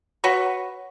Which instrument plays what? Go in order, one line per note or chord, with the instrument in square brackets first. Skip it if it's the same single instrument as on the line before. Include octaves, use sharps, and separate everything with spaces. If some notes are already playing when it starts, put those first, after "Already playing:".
[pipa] F#4 B4 C#5